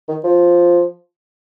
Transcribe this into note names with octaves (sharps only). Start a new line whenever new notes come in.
D#3
F3